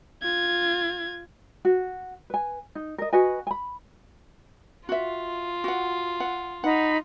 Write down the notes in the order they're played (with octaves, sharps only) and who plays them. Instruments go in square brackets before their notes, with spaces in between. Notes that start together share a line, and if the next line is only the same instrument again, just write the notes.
[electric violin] F4 G#6
[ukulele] F#4
B4 G#5
D#4
A#4 D#5
F#4 B4 D#5 G#5
G#5 B5
[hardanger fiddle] F4 [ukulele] F#4 E5
[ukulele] F#4 F#5
F#5
[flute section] D#4 B5 [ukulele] F#5